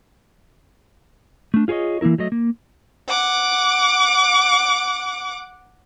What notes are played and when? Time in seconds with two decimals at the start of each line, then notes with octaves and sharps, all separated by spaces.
1.54 A3 D4
1.68 F4 G#4 A#4 C#5 D#5
2.01 E3 A#3 C#4 E4 A#4
2.18 F#3 A3 D#5
2.32 A#3
3.08 F#5 D6